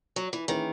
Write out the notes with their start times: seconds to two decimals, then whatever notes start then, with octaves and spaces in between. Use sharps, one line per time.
0.16 F#3
0.33 E3
0.48 D#3 E3 A#3 C#4 G#4 B4